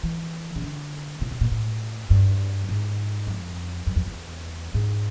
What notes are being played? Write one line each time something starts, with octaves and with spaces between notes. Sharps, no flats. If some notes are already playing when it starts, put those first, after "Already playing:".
E3
C#3
D3
C3
B2
A#2
A2
G2
G#2
F2
F#2
F2
E2
G#2